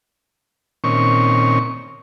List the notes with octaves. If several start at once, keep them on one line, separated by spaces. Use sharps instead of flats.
A#2 D#3 C4 C#4 C#6